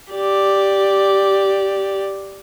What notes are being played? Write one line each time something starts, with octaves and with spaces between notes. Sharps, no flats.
G4 D5